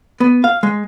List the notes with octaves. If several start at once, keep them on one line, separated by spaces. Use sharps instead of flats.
B3
F5
G#3